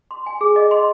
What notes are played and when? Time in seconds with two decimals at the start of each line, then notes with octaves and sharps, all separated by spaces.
0.11 C6
0.26 G#5
0.41 G#4
0.56 D#5
0.71 C6